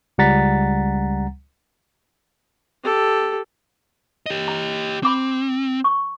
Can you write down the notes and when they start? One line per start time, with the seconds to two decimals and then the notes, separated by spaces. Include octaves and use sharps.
0.18 C#2 G3 F#5 A#5 A6 B6
2.84 G4 A4
4.26 G4 D#5
4.48 A#5
5.03 C4 B5 D6 E6
5.84 C#6